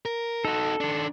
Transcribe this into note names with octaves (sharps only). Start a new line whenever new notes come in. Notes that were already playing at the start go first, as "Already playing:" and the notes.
A#4
D#4 F#4 A4
D#3 D4